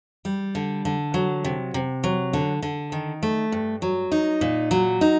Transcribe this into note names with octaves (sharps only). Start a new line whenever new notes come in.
G3
D3
D3
F#3
C3
C3
F#3
D3
D3
D#3
A3
G2
F#3
D#4
A#2
F#3
D#4